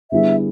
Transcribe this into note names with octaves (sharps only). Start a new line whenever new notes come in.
D3 G3 B3 E4 G#4 E5